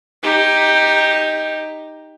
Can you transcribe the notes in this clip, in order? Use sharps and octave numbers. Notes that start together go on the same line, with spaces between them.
D#4 G4